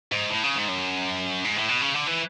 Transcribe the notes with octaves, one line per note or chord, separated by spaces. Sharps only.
G#2
A2
C#3
G#2
F#2
G#2
A2
B2
C#3
D3
E3